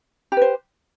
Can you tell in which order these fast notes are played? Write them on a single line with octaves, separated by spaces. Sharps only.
G4 B4 C5